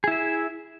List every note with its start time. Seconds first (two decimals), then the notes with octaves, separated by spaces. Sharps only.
0.04 G#4
0.08 E4
0.11 E5